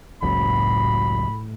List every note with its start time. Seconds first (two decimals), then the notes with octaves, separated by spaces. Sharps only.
0.22 F#1 C#2 F#2 A2 B5